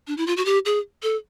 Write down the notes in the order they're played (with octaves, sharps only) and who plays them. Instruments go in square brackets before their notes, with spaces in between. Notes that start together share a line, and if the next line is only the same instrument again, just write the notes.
[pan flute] D4
E4
F4
F#4
G4
G#4
A4